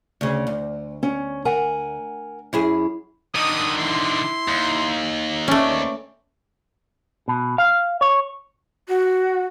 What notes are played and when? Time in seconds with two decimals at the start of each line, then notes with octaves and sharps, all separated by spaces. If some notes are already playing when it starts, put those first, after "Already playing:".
0.21 D2 C#3
0.47 D2
1.03 C#4
1.45 A#4 F#5 G#5
2.53 F#2 E4 G#4
3.35 D3 D#3 D#5 D#6
3.79 E4 C6
4.48 D#2
5.48 A3 C4 C#4 B4 D5
7.28 B2
7.58 F5
8.01 C#5
8.88 F#4